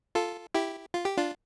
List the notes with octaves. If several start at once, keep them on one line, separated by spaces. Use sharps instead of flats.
F4 A4
E4 G4
F4
G4
D4 F4